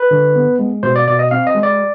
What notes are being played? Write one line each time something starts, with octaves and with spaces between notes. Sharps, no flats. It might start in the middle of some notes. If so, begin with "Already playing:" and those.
Already playing: B4
D3
B3
G#3
B2 C5
D5
B2 D5
D#5
C4 F5
D#5
G#3
D5